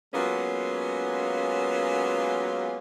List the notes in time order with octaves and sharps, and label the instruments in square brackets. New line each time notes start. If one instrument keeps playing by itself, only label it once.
[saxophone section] F#3 G#3 A#3 B3 C#4 F4